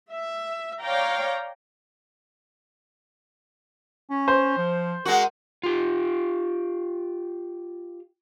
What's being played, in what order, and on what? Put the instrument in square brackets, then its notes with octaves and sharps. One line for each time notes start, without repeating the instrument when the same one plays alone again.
[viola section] E5
C#5 D5 F5 G5 A#5
[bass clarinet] C#4
[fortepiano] C5
[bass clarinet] F3
[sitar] G#3 F#4 [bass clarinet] A#4
[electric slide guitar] F4 G4